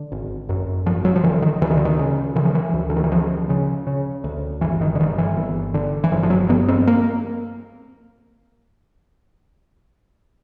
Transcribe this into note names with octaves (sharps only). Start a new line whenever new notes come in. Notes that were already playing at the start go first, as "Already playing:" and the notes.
Already playing: D3
G#1
F#2
G#1 F3
F#3
F3
D3 E3
D#3
D2 E3
D#3
D3
D#3
C#3
C#3 E3
F3
E3
D2
D3
D#3
E3
D2 F3
C#3
C#3
D2
G1 E3
D#3
D3
G2 D#3
E3
G1
D3
E3
G1 F3
F3
F#3
G2 B3
C4
A#3